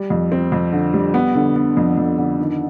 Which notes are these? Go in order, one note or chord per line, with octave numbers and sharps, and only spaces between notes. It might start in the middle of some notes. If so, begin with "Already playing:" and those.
Already playing: G3
F2
C4
F2
D3
G3
B3
D3
B3
F2
F2
D3
D#3